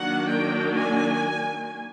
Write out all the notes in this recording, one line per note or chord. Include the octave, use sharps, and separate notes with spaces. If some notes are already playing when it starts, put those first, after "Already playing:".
Already playing: D#3 F#3 A#3 D4 F#5
G5
G#5